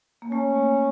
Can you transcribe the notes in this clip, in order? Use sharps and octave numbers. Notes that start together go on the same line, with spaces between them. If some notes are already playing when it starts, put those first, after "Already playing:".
A#3
A3 C#4
A#3